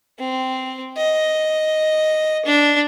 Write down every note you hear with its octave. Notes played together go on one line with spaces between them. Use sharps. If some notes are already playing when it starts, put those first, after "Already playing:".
C4
D#5
D4